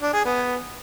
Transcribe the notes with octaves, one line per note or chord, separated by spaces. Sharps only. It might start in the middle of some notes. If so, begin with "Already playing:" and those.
D4
G#4
B3